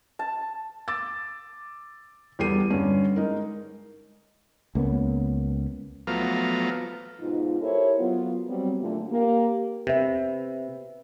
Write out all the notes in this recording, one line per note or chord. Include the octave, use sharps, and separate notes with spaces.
A5
D6 E6 A6
E2 G3 G4 A4 C7 D#7
G2 D3 C#4
G#3 D#4 A#4
C#2 A#3 B3 C#4
F3 F#3 A3 B3 F5 A#5
G#2 B2 D#4 F4
E4 G4 A4 A#4 C5 C#5
F#3 B3 F4
F#3 G3 B3 C4
F#2 A#2 D3 F3 A3
A#3 G4
C3 B4 E5